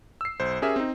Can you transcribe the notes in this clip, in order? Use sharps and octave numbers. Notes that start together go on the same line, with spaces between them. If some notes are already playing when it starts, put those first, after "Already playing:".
E6 C7
B1 C5
C#4 G4 G#4 A#4 E5
C4 D#4